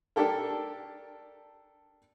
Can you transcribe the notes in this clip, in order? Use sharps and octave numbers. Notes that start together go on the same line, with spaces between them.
D4 G4 A4 A#4